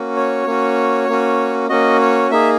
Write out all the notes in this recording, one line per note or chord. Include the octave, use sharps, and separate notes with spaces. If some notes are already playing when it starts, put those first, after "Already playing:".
Already playing: A#3 C#4 F#4
C#5
A#3 C#4 F#4
A#3 C#4 F#4
A#3 C#4 F#4 D#5
C#5
A#3 D#4 G#4 E5